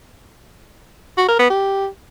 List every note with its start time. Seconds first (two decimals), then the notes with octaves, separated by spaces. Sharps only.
1.18 F#4
1.28 A#4
1.39 B3
1.50 G4